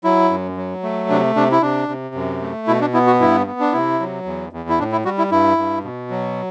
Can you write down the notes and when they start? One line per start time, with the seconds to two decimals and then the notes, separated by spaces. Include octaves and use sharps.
0.04 F#3 E4
0.30 F#2
0.57 F#3
0.83 A3
1.10 C3 D4
1.36 C3 D4
1.52 E4
1.62 C3 D4
1.89 C3
2.15 F#2
2.42 A3
2.67 B2 E4
2.81 D4
2.94 B3 E4
3.07 F#4
3.20 G2 E4
3.47 B3
3.60 D4
3.73 C3 E4
4.00 F#3
4.26 E2
4.53 E2
4.69 E4
4.79 A2 D4
4.92 E4
5.05 G3 F#4
5.18 E4
5.31 G2 E4
5.57 G2
5.84 B2
6.10 F#3